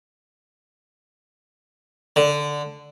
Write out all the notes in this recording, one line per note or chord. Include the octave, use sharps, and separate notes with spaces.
D3